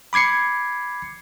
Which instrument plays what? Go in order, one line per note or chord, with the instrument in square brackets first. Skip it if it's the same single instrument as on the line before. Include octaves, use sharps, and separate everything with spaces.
[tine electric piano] B5 D6 G#6 C7 C#7